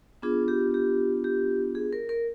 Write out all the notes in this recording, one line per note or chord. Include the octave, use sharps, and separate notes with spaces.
B3 D4 F4 G#4
G4
G4
G4
G#4
A#4
A#4